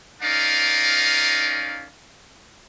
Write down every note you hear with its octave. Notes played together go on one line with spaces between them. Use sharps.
C#4 D#4 A#4 D5 F5